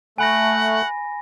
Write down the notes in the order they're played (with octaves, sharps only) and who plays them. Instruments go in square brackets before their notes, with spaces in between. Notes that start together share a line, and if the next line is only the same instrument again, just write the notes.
[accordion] A3 [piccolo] F#5 [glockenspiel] G#5 B5 A#6